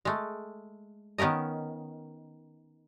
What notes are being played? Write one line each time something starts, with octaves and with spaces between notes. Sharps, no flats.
G#3 A3
D#3 B3 C#4 A#4 D#5